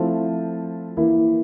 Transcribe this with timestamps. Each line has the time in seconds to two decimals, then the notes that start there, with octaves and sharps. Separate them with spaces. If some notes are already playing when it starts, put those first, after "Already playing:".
Already playing: F3 A3 C4 E4 F4
0.97 E3 A#3 E4